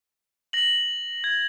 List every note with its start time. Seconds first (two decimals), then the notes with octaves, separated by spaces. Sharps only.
0.53 A#6 F#7
1.24 G#6